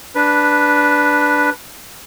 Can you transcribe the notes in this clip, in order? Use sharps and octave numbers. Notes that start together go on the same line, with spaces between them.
D4 B4